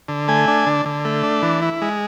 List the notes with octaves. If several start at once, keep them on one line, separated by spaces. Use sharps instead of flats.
D3
A3 G#5
D4
D3
D3
A3
D4
E3
E4
G#3